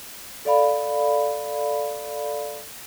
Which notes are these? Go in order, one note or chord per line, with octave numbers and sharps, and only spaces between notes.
A4 D5 F5 B5